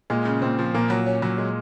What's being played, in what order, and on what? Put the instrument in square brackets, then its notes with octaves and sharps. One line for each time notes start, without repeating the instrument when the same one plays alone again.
[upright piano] A#2 [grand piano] G#3
[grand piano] C#3
[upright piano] A#2 [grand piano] C4
[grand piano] F3
[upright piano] A#2 [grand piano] A#3
[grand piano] F#3
C#4
F#3
G#3